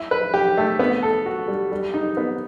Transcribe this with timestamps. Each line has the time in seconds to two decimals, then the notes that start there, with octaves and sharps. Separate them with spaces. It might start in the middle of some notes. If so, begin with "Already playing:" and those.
Already playing: E4
0.11 B4
0.34 G4
0.57 A3
0.79 B3
1.02 A4
1.26 F#4
1.48 G3
1.72 G3
1.94 D#4
2.17 B3